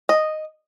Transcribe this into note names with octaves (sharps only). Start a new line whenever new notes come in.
D#5